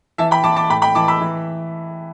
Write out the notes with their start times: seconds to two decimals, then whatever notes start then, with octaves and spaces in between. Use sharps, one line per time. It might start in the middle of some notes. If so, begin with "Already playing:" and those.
0.18 E3 E5 A5
0.31 G5 B5
0.44 E3 A5 D6
0.56 A5 D6
0.70 A2 G5 B5
0.82 G5 B5
0.95 E3 A5 D6
1.08 B5 E6
1.21 E3